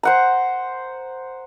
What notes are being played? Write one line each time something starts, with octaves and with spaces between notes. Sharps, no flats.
C5 F#5 A#5